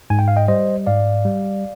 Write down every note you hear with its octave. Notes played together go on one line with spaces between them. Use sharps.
G#2 G#5
G5
F5
D#5 G5
G3 C5 D#5
G#2 D5 F5
G3